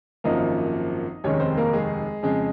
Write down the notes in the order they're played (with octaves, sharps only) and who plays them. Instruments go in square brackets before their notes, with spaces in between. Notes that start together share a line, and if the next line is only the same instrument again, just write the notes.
[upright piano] G#1 F#2 F3 A#3 D#4 D#5
F1 D#2 D#3 G#3 C#4 C#5
C4 C5
A#3 A#4
G#3 G#4
F2 C#3 G#3